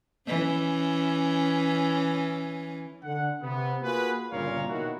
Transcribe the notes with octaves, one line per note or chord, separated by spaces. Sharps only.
E3 C#4
D3 F#5
C3 B3
A#3 F4 F#4 G#4 B4
G1 A#2 C#3 A#4 C#5 F5
B2 D#3 A#3 E4 F#4